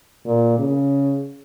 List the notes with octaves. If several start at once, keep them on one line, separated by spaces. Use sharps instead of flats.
A#2
C#3